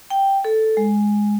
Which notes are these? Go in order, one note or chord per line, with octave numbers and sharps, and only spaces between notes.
G5
A4
G#3